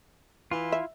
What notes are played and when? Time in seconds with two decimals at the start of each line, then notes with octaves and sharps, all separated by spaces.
0.51 E3 E4 F4
0.72 E5